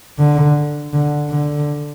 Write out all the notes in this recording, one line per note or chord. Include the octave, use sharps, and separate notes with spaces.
D3
D3
D3